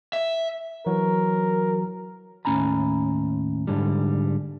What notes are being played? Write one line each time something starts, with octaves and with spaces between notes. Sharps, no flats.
E5
E3 F#3 F#4 A#4
D#2 A2 C#4 G#5 A#5 B5
G#2 D3 G3